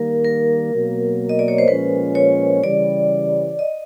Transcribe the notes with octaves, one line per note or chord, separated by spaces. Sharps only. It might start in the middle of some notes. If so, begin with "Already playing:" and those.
Already playing: D#3 G3 A#3 A#4
A#4
B2 F#3 A#3
D#5
D5
C#5
C5
A#2 F3 G#3 C#4 B4
C#5
C#3 E3 G3 D5
D#5